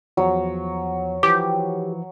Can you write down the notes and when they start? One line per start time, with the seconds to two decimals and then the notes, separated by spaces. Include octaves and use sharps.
0.17 E2 F3 F#3
1.23 E3 F3 G4 D6